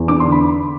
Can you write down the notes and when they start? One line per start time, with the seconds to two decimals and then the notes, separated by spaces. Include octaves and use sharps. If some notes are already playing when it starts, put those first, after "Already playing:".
Already playing: E2
0.08 D4 D6
0.20 C6
0.24 D3
0.32 B5